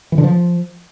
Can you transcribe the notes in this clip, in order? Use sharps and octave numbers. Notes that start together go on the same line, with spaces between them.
E3
D3
F3